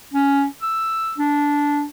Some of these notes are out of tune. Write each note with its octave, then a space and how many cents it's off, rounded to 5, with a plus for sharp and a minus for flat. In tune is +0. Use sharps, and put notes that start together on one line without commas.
C#4 +10
E6 +5
D4 -15